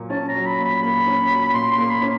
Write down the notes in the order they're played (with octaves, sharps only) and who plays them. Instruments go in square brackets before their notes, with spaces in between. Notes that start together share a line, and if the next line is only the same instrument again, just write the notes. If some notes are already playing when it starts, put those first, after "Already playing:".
Already playing: [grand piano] A#2 F#3 A#3
[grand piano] C#4 [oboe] A5
[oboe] A#5
[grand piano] F#3
[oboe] B5
[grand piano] A#2
[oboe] B5
[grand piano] A#3 [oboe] B5
[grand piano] C#4
F#3
[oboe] B5
[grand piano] A#2 [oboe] C6
[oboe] C6
[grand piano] A#3
[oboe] B5
[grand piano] C#4